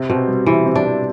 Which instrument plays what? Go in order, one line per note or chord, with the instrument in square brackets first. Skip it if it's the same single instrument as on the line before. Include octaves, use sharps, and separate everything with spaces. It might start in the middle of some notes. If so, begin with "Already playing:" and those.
Already playing: [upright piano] C3
[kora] B2 [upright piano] C4
[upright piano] G3
[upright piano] C3 [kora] E3
[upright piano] C3
[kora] D4
[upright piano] C4